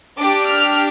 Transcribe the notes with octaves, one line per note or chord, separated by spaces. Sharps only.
D4 G4 D6
F6